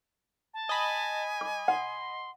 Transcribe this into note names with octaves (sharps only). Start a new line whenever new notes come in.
A5
D#5 G#5 B5
D6
F#5 C6